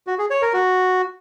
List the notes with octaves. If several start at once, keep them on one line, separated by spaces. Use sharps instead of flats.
F#4
G#4
C#5
A#4
F#4